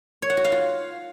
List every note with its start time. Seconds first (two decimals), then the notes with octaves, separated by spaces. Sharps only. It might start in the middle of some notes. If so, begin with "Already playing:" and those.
0.22 C#5
0.30 F#5
0.37 F#4
0.44 F5
0.52 F4